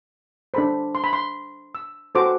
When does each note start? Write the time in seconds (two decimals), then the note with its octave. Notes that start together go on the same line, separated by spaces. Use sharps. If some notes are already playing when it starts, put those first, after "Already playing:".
0.54 D4 A4 C5 B5
0.95 C6
1.04 B5
1.13 C6
1.75 E6
2.15 F#4 A4 C5 D6